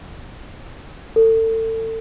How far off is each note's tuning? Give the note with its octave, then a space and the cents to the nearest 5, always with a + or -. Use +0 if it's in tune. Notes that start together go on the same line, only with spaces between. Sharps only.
A4 +30